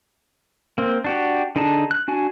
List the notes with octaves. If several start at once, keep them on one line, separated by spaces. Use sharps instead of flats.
A#3 C4
D4 F#4 G4
D3 D4 D#4 G#4 A5
F#6
D4 F#4 G#5